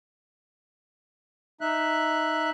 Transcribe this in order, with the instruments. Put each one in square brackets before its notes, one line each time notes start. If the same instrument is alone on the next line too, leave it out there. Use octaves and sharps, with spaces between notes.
[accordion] D#4 E5 F#6